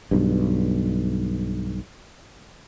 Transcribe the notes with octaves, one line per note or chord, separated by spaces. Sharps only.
B1 G2